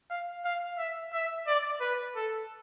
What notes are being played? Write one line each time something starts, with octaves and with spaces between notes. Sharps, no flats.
F5
F5
E5
E5
D5
B4
A4